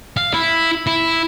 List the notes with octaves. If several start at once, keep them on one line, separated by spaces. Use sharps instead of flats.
F5
E4
E4